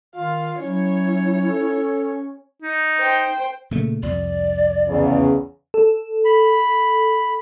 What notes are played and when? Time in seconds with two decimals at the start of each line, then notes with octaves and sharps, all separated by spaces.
0.16 D#3 F4 F5
0.59 F#3 C#4 E4 C#5
1.48 A4
2.62 D#4
2.98 C5 G5
3.71 A#2 C#3 A3
4.03 C2 F2 D5
4.87 E2 C#3
5.74 A4
6.25 B5